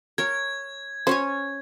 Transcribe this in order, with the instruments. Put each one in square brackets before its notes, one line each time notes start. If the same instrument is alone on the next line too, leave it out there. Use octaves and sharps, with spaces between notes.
[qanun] A#4 C#5 [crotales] G#6
[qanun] C#4 C#5 G#5 [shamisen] C5